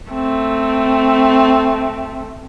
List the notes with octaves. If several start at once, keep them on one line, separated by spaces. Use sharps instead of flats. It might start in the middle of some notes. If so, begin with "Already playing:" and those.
A3 C4